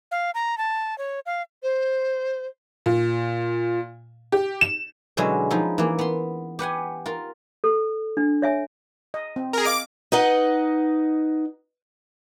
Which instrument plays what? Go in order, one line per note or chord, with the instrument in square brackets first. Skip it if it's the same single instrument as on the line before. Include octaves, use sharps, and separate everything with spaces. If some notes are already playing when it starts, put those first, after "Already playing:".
[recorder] F5
A#5
A5
C#5
F5
[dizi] C5
[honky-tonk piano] A#2
G4
E7
[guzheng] B2 D3 F#3 G#3 C#4 E4
F3 D#4 E4
E3 A#3
B3 C6
G4 B4 F#5 G#5
F4 A#4
[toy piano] A4
D4
C#5 E5 G#5
[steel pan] D#5
C4
[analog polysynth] G#4 A#4
[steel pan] D#5 F5 [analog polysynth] D6 D7
[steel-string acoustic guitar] D#4 B4 D#5 F#5